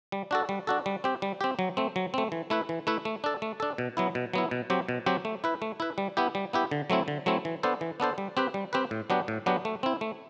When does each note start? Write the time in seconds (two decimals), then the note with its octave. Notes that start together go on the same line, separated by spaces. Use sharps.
0.12 G3
0.31 D4 F#4 A4
0.49 G3
0.67 D4 F#4 A4
0.86 G3
1.04 C4 G4
1.22 G3
1.41 C4 G4
1.59 F#3
1.77 A3 C4
1.96 F#3
2.14 A3 C4
2.32 E3
2.50 A3 E4 B4
2.69 E3
2.87 A3 E4 B4
3.05 A3
3.24 D4 A4
3.42 A3
3.60 D4 A4
3.78 B2
3.97 F#3 B3 E4
4.15 B2
4.33 F#3 B3 E4
4.51 B2
4.70 F#3 C4 G4
4.89 B2
5.06 F#3 C4 G4
5.25 A3
5.44 E4 B4
5.62 A3
5.80 E4 B4
5.98 G3
6.17 B3 E4 G4
6.35 G3
6.53 B3 E4 G4
6.71 D3
6.90 F#3 A3 C4 E4
7.08 D3
7.26 F#3 A3 C4 E4
7.45 E3
7.63 B3 D4 A4 C5
7.81 E3
8.00 B3 D4 A4 C5
8.18 G3
8.37 C4 G4 B4
8.54 G3
8.73 C4 G4 B4
8.91 A2
9.10 F#3 B3 D4 G4
9.28 A2
9.46 F#3 B3 D4 G4
9.65 A3
9.83 C4 E4
10.01 A3